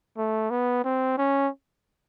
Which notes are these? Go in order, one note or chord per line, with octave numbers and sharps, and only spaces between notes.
A3
B3
C4
C#4